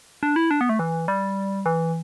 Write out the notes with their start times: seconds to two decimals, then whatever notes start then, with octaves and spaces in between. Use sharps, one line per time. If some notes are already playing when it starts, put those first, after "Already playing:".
0.23 D4
0.36 E4
0.51 D4
0.61 B3
0.69 A3
0.79 E3
1.08 G3
1.66 E3